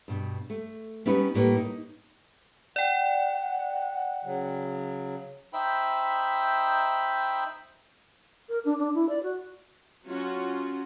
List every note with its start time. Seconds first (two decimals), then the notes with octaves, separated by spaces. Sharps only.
0.08 G2 B2
0.50 A3
1.06 G3 B3 C#4 D#4 B4
1.35 A2 G3 A#3 B4 C#5
1.57 D#4
2.76 D5 F#5 G5
4.24 C#3 F#3
5.53 D#4 C5 E5 G5 B5
8.49 A#4
8.65 D4
8.78 D4
8.94 E4
9.09 D5
9.23 F#4
10.06 F#3 C#4 F4 F#4